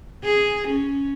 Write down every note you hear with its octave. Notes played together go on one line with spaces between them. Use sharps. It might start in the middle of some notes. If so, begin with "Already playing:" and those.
G#4
C#4